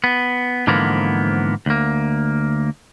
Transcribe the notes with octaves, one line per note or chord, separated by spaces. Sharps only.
B3
G#2 D3 E3 F3 A#3 B3
D2 A#3